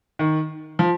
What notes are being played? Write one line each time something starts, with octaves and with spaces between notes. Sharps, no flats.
D#3
F3